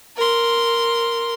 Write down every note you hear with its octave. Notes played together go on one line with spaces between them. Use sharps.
A#4 C6